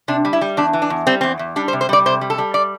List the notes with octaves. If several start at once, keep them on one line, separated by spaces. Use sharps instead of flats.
C3 D4
G3
E4
G3
E2 D4
E3
D4
E2
G3 C4
E2 C4
E2
G3 D4
C5
C3
C5
G3 D5
C3 C5
G3
A4
G3
D5